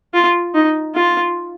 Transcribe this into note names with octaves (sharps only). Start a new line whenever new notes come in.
F4
D#4
F4